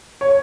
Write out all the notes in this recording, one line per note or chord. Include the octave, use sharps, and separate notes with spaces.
C#5